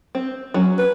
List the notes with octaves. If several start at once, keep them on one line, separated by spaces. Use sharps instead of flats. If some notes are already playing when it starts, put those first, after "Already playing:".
C4
F#3 C#4
B4